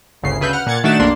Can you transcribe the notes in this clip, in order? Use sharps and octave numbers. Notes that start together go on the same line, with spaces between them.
G1 D2 C#3 C7
D2 C#3 B4 E5 G6
F#5 F6
A#2 F#5 G#6 A6 C#7
D#3 A3 D4 F#4 A6 E7
A#1 F2 A#3 D4 C6